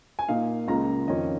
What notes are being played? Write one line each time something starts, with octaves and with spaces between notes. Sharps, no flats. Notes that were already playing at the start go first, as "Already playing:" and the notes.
G#5
A#2 A#3 D#4 F5
C#2 C#3 A#3 F4 A#5
F2 D#3 C#4 F4 D#5